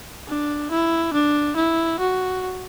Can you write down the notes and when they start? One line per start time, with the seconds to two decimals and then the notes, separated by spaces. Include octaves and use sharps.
0.28 D4
0.71 E4
1.13 D4
1.56 E4
2.00 F#4